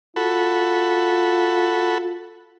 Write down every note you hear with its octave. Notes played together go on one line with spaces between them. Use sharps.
F4 F#4 A4 B5